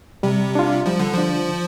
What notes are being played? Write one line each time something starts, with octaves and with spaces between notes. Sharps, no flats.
C3 G3
D4 F4
F3 G3
D3
F3 D4 F4
D3